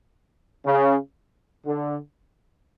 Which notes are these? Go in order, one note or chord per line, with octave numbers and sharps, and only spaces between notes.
C#3
D3